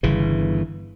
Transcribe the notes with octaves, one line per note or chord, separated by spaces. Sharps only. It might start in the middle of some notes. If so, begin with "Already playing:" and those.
G1 C#3 E3